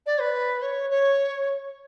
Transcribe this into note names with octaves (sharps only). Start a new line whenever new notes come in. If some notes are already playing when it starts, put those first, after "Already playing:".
D5
B4
C#5
C#5